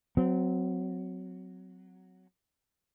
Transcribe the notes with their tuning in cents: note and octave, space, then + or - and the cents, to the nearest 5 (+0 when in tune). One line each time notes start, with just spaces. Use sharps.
F#3 +0 C4 -25